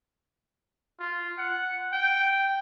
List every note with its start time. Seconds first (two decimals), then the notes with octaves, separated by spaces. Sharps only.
1.00 F4
1.38 F#5
1.93 G5